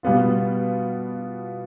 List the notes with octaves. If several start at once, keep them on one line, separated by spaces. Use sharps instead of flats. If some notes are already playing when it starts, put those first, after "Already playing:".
B2 G3 B3 F4